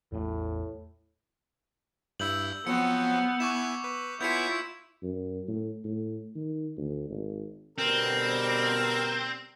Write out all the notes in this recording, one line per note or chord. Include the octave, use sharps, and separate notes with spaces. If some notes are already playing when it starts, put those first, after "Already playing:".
A1 E2 A2 A3
G2 E4 E6 G6 F#7
F3 F#3 B3 C4 C#7
E4 G#5 C#6 D6 E7
B4
B3 E4 F4 C#5 G#5 G6 B6 C#7
F#2
A2
A2
D#3
D2
G#1
B2 D3 G3 C4 A#4